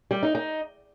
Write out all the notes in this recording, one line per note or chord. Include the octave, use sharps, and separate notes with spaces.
G3
D#4
D#4